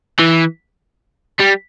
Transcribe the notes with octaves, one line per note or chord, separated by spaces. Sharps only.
E3
G3